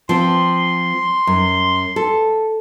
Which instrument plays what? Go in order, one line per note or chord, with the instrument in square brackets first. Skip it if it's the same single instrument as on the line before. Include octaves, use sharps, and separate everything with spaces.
[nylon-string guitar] F3 C4 [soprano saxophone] C6
[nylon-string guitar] F#2
A4